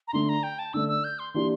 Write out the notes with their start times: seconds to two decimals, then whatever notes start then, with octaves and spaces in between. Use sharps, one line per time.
0.08 A#5
0.13 D3 A3 D4 C6
0.29 A#5
0.43 G5
0.59 A5
0.73 D3 A3 D4 E6
0.88 E6
1.04 G6
1.19 C6
1.34 E3 A#3 D4 G4 C6